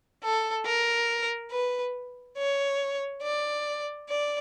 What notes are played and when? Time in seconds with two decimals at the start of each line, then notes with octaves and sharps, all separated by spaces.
0.23 A4
0.65 A#4
1.51 B4
2.37 C#5
3.22 D5
4.09 D5